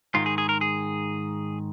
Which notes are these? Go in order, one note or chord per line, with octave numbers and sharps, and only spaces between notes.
G#2 D#3 G#3 F4
G#4
G#4
A#4
G#4